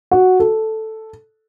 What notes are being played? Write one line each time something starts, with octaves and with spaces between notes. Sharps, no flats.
F#4
A4